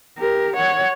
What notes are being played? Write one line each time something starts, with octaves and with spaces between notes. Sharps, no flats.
G4 A#4
C#5 F#5